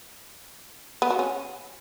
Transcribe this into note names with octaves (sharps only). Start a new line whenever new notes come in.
B3
F#4
C#4